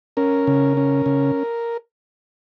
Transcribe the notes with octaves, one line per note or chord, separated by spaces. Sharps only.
C#4 A#4
C#3
C#4
C#3